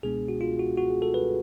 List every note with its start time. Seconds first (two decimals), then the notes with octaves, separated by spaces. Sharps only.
0.03 C#2 B2 G#3 B3 D4 G#4
0.28 F#4
0.41 F4
0.59 F#4
0.78 F#4
0.90 G#4
1.02 A4
1.14 B4